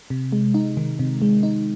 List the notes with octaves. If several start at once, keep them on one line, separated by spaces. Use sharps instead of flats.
C3
G#3
D#4
D#3
C3
G#3
D#4